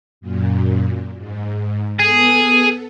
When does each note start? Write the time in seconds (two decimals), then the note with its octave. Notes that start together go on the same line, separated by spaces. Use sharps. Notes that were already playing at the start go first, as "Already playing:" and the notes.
0.21 F#2 A#2
1.17 G#2
1.99 B3 G#4 A4